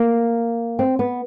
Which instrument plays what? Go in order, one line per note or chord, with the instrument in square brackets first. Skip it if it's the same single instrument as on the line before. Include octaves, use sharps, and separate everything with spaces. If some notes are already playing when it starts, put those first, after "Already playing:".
Already playing: [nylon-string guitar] A#3
C4
B3